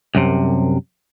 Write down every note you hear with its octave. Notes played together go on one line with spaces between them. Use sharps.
C2 F#2 C3